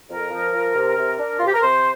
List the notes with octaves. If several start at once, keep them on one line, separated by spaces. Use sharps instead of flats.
F2 A#4
F3
F3
C3
C3
D4
C3 F4
G4
A#4
C3 C5